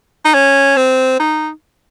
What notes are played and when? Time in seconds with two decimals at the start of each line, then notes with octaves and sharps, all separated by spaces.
0.25 D#4
0.34 C#4
0.77 C4
1.20 D#4